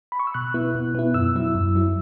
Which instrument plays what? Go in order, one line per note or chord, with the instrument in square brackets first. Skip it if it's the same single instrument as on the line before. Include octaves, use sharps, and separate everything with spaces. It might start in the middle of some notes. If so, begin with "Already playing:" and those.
[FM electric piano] B5
C#6
E6
B2 F#6
B3 E4
B2
B3 E4
F#2 E6
F#3 E4
F#2
F#3 E4